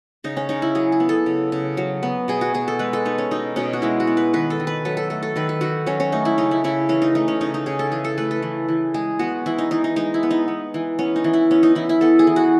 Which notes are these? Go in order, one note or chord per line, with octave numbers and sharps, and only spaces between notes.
C#3 D#4
C#4
C#3 D#4
E4
F#3 G#4
G#4
B3
A4
C#3
C#3
F#3
B3
B2 G#4
F#4
B2 G#4
A4
G#3 B4
A4
B3 D#4
C#4
B2 D#4
B2 C#4
F#4
G#3 E4
F#4
B3
B4
D#3 B4
A4
D#3
B4
F#3 A4
A4
A3 A4
A4
D#3 B4
A4
D#3 F#4
F#3 C#4
C#4
A3 D#4
E4
C#3 D#4
E4
C#3 E4
E3 C#4
D#4
A3 D#4
C#4
C#3 D#4
D#4
C#3 G#4
A4
E3 G#4
A4
A3 B4
A4
E3
E3
G#3 G#4
B3 F#4
E3 E4
D#4
E3 D#4
D#4
G#3 D#4
E4
B3
D#4
B3
E3
B3 C#4
D#4
E3
E4
B3 C#4
D#4
E3 E4
E4
B3 A4
G#4
E3
F#4